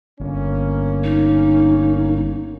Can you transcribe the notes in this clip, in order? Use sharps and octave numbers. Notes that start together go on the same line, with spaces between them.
G1 A#3 C#4
D#4